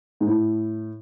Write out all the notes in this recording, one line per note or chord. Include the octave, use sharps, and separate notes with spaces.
G#2
A2